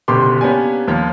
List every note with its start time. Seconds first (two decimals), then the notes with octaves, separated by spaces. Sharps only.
0.08 F#1 B2 D3 G4 C6 D6
0.41 A#3 B3 C#4 D4 G4 G#5
0.88 D#2 F3 A#3 C#5